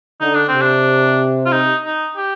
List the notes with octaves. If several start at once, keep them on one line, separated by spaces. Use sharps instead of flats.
D3 D#4
D4
C4
C3
D4
F4
D#4
D#4
G4